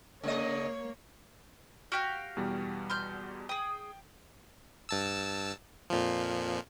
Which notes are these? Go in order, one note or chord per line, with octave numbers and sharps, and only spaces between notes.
C#3 A#3 C#5 D#5
F#4 G4 F5 F6 D7
E2 B2 G3
C6 F6 G6
G#4 G5 D#6
G2 A5 E6
F2 A#2 F3